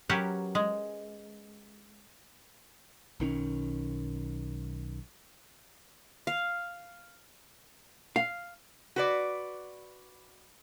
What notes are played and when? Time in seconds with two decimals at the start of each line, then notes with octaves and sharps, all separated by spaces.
0.09 F#3 C#4 G4 A#4 B4 F#5
0.55 G#3
3.20 B1 D#3 C4 C#4
6.27 F5
8.16 F5
8.96 F#4 B4 D5